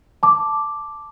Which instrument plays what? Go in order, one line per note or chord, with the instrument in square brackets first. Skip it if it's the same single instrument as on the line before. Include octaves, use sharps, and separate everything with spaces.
[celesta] A5 D6